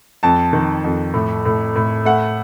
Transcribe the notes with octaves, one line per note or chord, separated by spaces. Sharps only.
F2 A5
D#3
F2
A2
A2
A2
A3 F#5